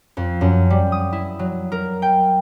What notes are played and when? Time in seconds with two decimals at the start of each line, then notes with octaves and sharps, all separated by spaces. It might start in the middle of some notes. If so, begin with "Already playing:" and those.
0.17 F2
0.41 F#2
0.70 G3
0.92 D#6
1.13 E4
1.39 F#3
1.72 A#4
2.02 G5